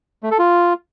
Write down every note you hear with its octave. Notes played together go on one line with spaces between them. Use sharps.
A3
A4
F4